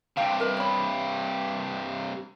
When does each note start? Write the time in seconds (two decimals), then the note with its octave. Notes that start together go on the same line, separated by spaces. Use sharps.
0.17 G2 C3 F5 G5
0.40 A#4 B4
0.57 C#5 B5